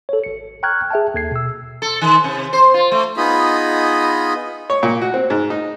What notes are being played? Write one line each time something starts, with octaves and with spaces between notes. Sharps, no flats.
A4 C#5
G#1 C#7
G5 A#5 C#6 F6 F#6 G#6
G#4 E5 G5 A5
D#2 A4 G#6 C7
B2 E6
A4
D#3
C3
C5
F4
A3
B3 D#4 F4 G#4 D#5 B5
C#5
A#2
F#4
C4
G#2
D#4